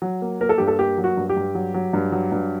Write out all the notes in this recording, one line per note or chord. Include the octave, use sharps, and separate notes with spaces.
F#3
A#3
A#3 A#4
A4
G2 G4
A4
A#3 G4
F#3
F#4
G2
G4
G2
F#3
F#3
G2
F#3
G2